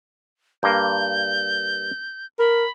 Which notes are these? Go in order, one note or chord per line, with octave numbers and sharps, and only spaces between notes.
G2 A#3 G6
A#4 B5